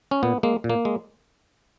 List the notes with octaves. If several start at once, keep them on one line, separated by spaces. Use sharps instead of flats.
C#4
A#2 B3
G#3 A#3
A#2
A#3
G#3